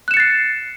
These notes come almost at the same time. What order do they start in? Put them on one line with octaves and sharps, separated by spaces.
F#6 E7 C#7 A6 C7